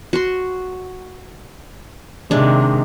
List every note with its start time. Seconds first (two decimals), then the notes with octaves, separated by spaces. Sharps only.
0.13 F#4 C6
2.31 C3 D#3 G#3 D4